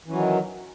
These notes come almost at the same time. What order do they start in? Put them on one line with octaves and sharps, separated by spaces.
E3 C#4 F#3 D#3